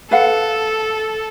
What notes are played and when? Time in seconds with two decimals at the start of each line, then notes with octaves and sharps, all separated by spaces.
0.11 A4 B4 F5 F#5